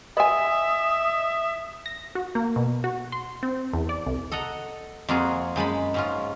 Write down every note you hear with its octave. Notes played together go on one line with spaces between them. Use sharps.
B4 D#5 E5 G#5 D#6
A#6
F#4
A#3
B2
F#4
C6
C4
E2
D5
C2
A4 D#5 F#5 A#5
F2 A#3 F4 F#4 G#4
F#2 G#3 A5 B5
G#2 C#4 F4